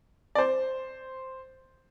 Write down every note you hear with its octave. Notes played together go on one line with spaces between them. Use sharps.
D5
C5